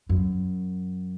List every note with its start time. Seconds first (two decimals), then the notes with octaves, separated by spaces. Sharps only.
0.09 F#2